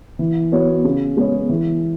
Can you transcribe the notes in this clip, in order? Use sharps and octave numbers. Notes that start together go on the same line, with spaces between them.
E3
B3 F#4 C#5
C#3
G#3 B3 G#4 C#5
E3